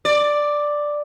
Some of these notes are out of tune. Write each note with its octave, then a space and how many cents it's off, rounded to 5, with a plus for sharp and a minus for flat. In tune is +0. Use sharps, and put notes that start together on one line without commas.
D5 +5